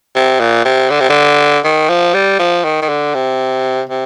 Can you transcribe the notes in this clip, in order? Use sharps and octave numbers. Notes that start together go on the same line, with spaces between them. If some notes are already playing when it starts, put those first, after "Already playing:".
C3
A#2
C3
D3
C3
D3
D#3
F3
G3
F3
D#3
D#3
D3
C3
C3